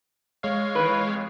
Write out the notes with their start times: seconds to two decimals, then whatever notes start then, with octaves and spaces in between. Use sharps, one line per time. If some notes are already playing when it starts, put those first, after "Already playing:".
0.43 G#3 C#5 F5
0.75 E3 A#3 B4
1.07 F2